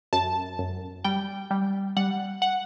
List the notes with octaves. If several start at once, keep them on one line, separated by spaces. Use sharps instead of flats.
F#2 A5
F#2
G3 G5
G3
G3 F#5
F#5